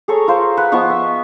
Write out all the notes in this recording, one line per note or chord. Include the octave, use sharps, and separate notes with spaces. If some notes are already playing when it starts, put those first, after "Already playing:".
G#4 A4 C#5 A#5
F4 A#4 C5
B4 F#5
F3 B3 D#5 C#6
E5